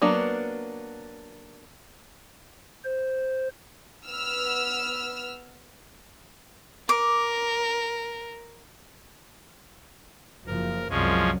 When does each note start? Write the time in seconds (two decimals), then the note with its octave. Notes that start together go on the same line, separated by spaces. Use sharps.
0.02 F#3 A#3 B3 D4
2.85 C5
4.06 B3 E6 F6
6.89 A#4 D6
10.47 F#1 F3 A#4
10.90 C2 F#2 F3 G#3 C#4